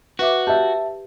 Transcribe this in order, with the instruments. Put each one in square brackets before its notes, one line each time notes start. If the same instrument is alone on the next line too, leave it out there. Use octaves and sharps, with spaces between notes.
[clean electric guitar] F#4 [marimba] B4 E5 D6
[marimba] G4 [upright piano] E5 A5